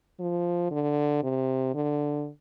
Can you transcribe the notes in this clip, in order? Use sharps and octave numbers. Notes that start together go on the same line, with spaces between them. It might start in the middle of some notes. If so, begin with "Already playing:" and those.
F3
D3
C3
D3